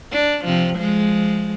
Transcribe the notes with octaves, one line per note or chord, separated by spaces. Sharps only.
D4
C3 F3
F3 G#3